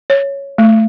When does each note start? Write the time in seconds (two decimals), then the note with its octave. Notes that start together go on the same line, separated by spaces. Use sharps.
0.10 C#5
0.58 A3